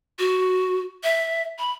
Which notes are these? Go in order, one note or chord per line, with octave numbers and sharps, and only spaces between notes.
F#4
E5
B5